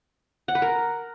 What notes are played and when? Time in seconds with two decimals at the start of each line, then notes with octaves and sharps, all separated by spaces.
0.48 F#5
0.55 B4
0.62 A#4